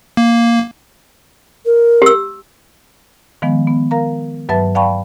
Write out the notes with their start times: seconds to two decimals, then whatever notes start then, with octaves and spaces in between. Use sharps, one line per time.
0.17 A#3
1.66 A#4
2.02 G4 E6
3.42 D#3 F3 G#3 B3
3.67 B3
3.91 A#4 F5 A#5
4.49 G2 F#3 B4 E5 A5 A6
4.75 D5 F5 G5 A5 B5 C#6